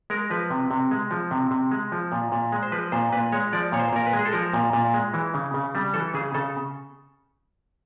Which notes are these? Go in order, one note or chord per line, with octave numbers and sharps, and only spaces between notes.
G#3 A#4
F3 B4
C3
C3
G#3
F3
C3
C3
G#3
F3
A#2
A#2
G#3
C5
F3 B4
A#2 C5
A#2 B4
G#3 C#5
F3 D5
A#2 C#5
C5
A#2 A#4
B4
G#3
G#4
A4
F3 A#4
A#2
A#2
G#3
E3
C#3
C#3
G3
E3 A4
C#3 G#4
C#3 A4